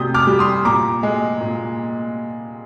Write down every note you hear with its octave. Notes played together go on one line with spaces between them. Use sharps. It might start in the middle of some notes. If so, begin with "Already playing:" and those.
Already playing: C3 D#6 G6
D6 F6
G3
C6 D#6
A#2 A#5 D6
G#3
A#2